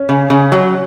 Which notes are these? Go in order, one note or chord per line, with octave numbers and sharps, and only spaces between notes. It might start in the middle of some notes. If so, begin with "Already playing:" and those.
Already playing: C#4
C#3
C#3
F#3